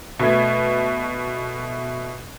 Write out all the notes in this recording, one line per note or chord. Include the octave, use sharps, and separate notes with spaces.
B2 A3 G#6